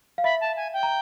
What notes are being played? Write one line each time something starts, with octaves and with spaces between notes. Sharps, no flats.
F5
E5 B5
A5
G#5
G5
A#5